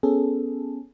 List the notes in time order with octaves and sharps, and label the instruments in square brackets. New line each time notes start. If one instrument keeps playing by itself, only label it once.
[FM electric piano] B3 C#4 G#4 A4